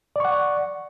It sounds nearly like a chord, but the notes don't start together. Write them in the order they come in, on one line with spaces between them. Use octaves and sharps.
D5 C#6 F#5